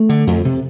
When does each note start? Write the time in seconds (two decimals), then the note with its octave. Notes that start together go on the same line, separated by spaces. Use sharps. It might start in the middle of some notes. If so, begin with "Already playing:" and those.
Already playing: A3
0.09 D3
0.27 F2
0.45 C3